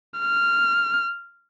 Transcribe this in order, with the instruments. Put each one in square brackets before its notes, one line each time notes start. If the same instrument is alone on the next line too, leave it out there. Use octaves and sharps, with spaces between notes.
[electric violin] F6